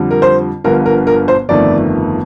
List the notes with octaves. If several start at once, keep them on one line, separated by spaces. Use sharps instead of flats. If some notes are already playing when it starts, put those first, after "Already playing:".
Already playing: F2 D3 G3
A#4
C5
G1 G2 D3 F3 A#4
A#4
A#4
C5
G1 F2 D#3 A3 D5